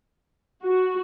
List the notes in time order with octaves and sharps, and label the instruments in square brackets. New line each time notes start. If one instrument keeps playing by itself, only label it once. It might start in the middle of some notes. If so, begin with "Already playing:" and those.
[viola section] F#4